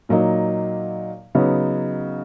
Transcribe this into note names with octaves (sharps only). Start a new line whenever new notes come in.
A#2 F#3 A#3 D#4
C#3 F#3 B3 D#4